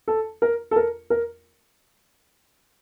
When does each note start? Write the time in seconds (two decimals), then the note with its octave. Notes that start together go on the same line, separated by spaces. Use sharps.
0.08 A4
0.42 A#4
0.71 A4
0.76 A#4
1.10 A#4